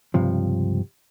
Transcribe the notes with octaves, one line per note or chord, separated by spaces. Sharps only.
C#2 G2 C3 F3